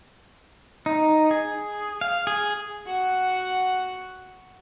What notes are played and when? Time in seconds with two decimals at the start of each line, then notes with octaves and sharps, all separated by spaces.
0.86 D#4
1.31 G#4
2.01 F5
2.27 G#4
2.87 F#4 F#5